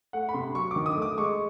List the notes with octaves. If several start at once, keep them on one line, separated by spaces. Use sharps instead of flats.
A3 F#5
B5
C3 C6
F#3 C#6
D6
D#3
D#6
A3
D6
G#3 C#6